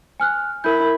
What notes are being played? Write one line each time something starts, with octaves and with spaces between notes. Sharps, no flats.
G#5 F6 F#6
E4 A#4 G6